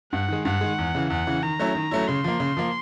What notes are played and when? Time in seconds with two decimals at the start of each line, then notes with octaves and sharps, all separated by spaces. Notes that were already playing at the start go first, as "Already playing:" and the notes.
0.13 G2 F#5
0.28 D#3 G#3
0.45 G2 F#5
0.61 D#3 G#3
0.78 E2
0.95 C#3 E3
1.10 E2 F#5
1.27 C#3 E3
1.43 D#3 A#5
1.59 F#3 A3 C#4 E4
1.75 D#3
1.91 F#3 A3 C#4 E4
2.08 C#3 C6
2.24 F3 A#3
2.40 C#3
2.57 F3 A#3